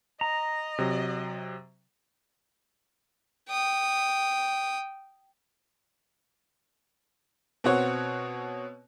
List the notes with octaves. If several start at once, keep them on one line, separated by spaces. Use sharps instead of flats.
D#5 A#5
C3 F#3
G5 D#6
B2 C4 F#4 C#5